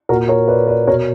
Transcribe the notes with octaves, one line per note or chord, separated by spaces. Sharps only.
A#2 F#4 A#4
A#4 C#5
B4 D5
B4 D5
B2 A#4 C#5